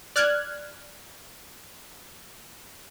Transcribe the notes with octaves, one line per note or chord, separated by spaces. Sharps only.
D5 F6 F#6 G#6